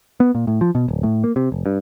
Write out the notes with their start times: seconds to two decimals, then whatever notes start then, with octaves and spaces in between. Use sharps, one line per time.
0.20 B3
0.35 A#2
0.47 A2
0.61 F3
0.75 B2
0.88 D1
1.03 A2
1.24 A#3
1.36 C3
1.52 F1
1.66 G2